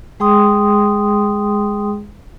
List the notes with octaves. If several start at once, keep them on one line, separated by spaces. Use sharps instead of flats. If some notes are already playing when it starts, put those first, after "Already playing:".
G#3 G#4 G5 C6 D#6